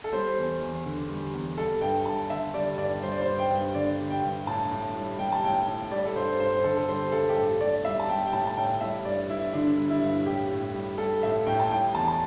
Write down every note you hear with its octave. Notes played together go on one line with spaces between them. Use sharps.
A4
G3 C5
E2
E2
D3
G3
E2
G3 A4
G2 G5
G2 A5
D3 E5
G3 D5
G2 D5
G3 C5
D5
C5
G2
G5
G2
D3 D5
G3
G5
G2
A2 A5
A2
G3
G3 G5
A5
A2 G5
A2
G3 D5
A4
G2 C5
G2 C5
D3 A4
A4
G3 C5
G2 A4
G4
A2 A4
A2 D5
G3 E5
A5
G3 G5
G5
A2 A5
A5
A2 G5
G3 E5
G2 D5
G2 E4
D3 D4
G3
E4
G2
A2 G4
A2
G3
G3 A4
A2 E5
A2 G5
A5
G3 G5
E2 A5
A5